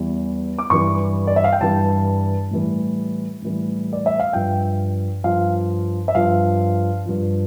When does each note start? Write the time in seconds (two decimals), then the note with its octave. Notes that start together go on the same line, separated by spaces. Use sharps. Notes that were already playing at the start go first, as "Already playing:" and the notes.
Already playing: E2 E3 G3
0.59 D6
0.70 G2 E3 G3 C#6
1.27 D5
1.36 E5
1.44 F5
1.53 G5
1.61 G2 E3 G3 A5
2.51 A2 E3 G3
3.42 A2 E3 G3
3.93 D5
4.06 E5
4.20 F5
4.33 G2 F3 G5
5.24 G2 F3 F5
6.08 E5
6.15 G2 F3 F5
7.06 G2 F3